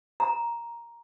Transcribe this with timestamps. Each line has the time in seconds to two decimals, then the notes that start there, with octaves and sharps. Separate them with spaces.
0.20 A#5